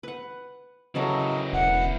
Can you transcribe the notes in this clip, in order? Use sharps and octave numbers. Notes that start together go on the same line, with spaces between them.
B4 F#5
C#3 E3 F#3 A4 A#4 D#5
E1 F#5